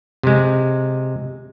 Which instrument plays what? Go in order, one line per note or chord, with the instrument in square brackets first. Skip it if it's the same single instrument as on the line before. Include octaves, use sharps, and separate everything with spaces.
[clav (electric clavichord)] C3 G#3